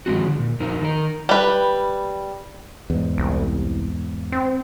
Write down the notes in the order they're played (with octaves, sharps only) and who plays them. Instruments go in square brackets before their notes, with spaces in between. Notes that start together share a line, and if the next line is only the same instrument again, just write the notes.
[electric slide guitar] D#3 F3 G#3 C4 F#4
D3
A#2
F2 D#4 A#4 C5
D#3 D#4 A#4
[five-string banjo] G3 B4
[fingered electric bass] E2 G#2
[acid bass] C2
C4